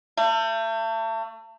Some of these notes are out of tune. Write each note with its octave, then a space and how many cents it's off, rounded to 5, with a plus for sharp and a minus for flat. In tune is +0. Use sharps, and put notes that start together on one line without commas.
A3 +35